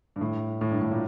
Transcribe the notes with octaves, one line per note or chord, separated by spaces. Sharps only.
G2
A2
A2
G2
A2
A#2